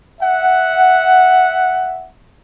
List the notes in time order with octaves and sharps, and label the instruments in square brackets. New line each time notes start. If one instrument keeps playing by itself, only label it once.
[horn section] E5 F#5